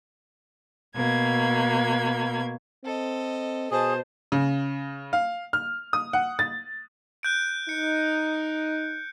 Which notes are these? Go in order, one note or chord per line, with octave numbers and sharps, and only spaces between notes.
B2 A#3 G#6
C4 A4 D#5
B2 G#4 C5 D#5 A5
C#3
F5
F6
D#6
F#5
A6
F#6 G6 D7
D#4 C#7